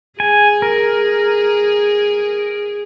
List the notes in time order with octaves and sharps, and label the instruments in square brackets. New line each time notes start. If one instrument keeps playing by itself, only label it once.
[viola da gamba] G#4 [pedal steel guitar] G#5
[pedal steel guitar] A#4